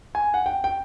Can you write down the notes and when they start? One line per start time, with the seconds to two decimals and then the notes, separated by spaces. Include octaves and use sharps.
0.15 G#5
0.34 F#5
0.46 G5
0.64 G5